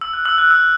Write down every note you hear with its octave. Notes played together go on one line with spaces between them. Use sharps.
E6
F#6
E6
F#6
E6